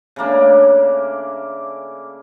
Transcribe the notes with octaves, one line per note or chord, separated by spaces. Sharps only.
C#3 A3 A#3 D4